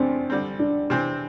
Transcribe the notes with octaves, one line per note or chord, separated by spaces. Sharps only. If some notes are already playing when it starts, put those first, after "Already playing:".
Already playing: E2 C3 A3 C4 D4
D3 G3 C4
D4
C3 E3 C4